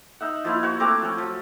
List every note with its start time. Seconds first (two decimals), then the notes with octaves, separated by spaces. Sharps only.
0.20 D#4 E5 F#5
0.44 F3 A#3 E4 F4
0.63 F#4 C5 C#5 F#5
0.80 A3 C4 A#5 D6
1.02 F3 C#4
1.18 F3 F#3